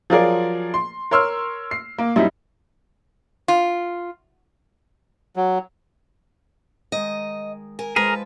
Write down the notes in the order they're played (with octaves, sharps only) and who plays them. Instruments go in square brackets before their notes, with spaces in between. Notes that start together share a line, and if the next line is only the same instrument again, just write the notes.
[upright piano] F3 F#3 F4 G#4 A#4 D5
C6
A#4 C#5 C6 E6 F6
C7
A#3
F#2 G3 D#4 E4
[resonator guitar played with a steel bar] F4
[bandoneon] F#3
[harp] D#3 G#3 [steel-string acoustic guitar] D#5
[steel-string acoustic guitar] A#4 [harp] G#5
[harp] F3 G#3 A5 [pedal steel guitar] G#4 A#4 [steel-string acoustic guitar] B4